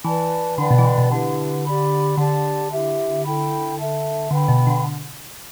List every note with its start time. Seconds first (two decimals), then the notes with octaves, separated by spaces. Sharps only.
0.04 E3 B4 D5 A5
0.57 D3 B4 D5 G5 B5
0.71 B2
0.78 E3
0.84 D3
0.98 B2
1.11 D3 E4 G4 B4
1.65 G4 D5 B5
2.17 D3 G4 D5 A5
2.71 E4 G4 E5
3.24 E4 A4 G5 B5
3.78 A4 E5 A5
4.31 D3 B4 G5 B5
4.48 B2
4.67 D3